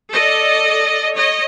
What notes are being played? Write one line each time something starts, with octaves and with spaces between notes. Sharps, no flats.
A4 D5 D#5
C#5 D#5